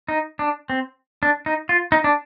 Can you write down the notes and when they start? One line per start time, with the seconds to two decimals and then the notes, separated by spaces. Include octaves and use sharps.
0.09 D#4
0.39 D4
0.70 C4
1.23 D4
1.46 D#4
1.69 F4
1.92 D#4
2.04 D4